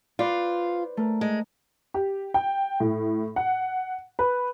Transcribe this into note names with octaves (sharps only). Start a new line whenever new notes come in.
F4 B4 C5 D5
A3 A#4
G#3
G4
G5
A2
F#5
B4